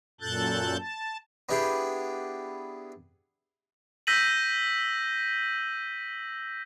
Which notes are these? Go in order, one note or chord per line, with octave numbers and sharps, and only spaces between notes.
F#2 A#2 A4 F#6 G6 A6
A5
B3 D4 E4 G4 G#4
E6 G6 A#6 B6 D#7 F#7